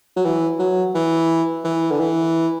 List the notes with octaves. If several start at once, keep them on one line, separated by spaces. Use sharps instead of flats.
F#3
E3
F#3
E3
E3
D3
E3